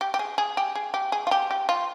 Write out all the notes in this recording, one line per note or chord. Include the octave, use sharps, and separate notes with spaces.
G4
G4
G#4
G#4
G4
G#4
G4
G#4
F4
G4
G4
F4